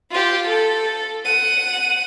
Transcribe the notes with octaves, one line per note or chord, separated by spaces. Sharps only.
F4 G4
A4
F#5 D#7